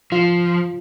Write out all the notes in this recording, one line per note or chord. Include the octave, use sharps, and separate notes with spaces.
F3 F4